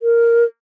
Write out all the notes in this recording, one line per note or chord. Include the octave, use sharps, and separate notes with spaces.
A#4